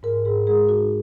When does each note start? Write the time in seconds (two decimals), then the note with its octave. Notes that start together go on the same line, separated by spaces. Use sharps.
0.03 G#2 A#4
0.25 G#2 G#4
0.47 G#3 G#4
0.69 D#4 F#4